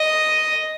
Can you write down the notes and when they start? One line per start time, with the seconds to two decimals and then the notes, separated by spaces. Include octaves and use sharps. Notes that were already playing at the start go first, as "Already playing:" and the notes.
Already playing: D#5